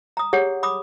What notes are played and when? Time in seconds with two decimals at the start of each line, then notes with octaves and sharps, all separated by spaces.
0.17 A#5 D#6
0.33 G4 G#4 C#5 F#5
0.63 B5 D6 D#6